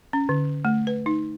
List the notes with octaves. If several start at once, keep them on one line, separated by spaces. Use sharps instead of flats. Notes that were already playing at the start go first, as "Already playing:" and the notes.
C#4
D3
A3
B4
D#4